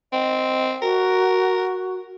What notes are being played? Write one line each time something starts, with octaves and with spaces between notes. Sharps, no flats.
C4 D#5
F#4 A#4